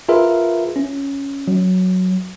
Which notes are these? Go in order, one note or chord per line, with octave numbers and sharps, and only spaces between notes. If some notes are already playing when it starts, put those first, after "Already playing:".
F4 G#4 A#4 B4 E5
C#4
F#3